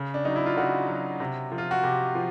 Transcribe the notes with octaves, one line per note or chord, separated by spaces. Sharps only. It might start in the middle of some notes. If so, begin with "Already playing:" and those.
Already playing: C#3
D4
F#3 D#4
E4
F4
C#3 F#4
F#3
C3
F3
F4
F#4
C3 G4
F3